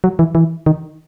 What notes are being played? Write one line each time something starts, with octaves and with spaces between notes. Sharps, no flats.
F#3
E3
E3
D#3